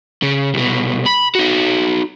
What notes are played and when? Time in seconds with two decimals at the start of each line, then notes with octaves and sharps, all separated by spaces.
0.22 C#3
0.54 C2 B2
1.06 B5
1.35 D#4 F#4